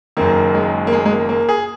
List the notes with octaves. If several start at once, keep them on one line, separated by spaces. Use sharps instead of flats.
F#1 F#2 D#3 A#3
G#3
A#3
G#3
G#3
A#3
A#3
G#4